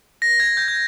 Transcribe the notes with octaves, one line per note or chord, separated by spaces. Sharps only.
A#6
G#6
G6
G6